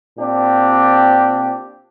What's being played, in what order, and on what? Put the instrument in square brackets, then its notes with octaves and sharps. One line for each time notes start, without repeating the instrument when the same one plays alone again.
[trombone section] A#2 C4 D4 G4